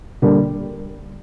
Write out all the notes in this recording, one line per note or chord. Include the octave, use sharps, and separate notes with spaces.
D3 G3 A#3 D4